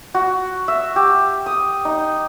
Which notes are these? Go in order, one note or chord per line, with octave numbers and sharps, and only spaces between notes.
F#4
E5
G4
D#6
D#4